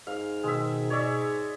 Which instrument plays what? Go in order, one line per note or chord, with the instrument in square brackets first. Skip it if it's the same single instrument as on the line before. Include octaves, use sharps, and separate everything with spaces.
[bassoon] G#2 [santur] F5
[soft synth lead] B2 [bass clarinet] D#3 [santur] G#3 E5
[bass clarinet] G#4 [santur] C#5 D5 E5